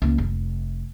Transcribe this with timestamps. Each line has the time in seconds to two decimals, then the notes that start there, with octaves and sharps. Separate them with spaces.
0.02 C#2 A#3
0.18 F1